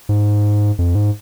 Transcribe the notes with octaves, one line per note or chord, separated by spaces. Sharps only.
G#2
F2
G#2